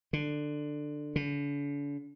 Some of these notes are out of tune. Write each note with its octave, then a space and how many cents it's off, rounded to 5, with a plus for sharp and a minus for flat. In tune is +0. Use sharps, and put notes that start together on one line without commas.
D3 +15
D3 -40